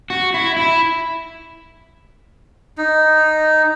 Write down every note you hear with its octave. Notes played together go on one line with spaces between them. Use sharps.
F#4
E4
E4
D#4